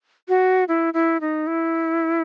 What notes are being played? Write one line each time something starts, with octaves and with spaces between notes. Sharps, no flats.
F#4
E4
E4
D#4
E4